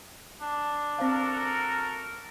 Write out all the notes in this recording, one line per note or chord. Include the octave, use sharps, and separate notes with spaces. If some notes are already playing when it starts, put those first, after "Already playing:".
D4
C4 F#4 A4 A#4 C5 F5